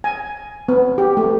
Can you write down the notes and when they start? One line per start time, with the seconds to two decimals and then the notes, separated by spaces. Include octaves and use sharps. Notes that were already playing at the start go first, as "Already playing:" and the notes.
0.04 G#5
0.68 B3
0.98 G4
1.17 A3